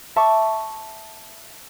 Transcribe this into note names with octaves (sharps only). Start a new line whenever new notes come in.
E5 A5 C#6 D6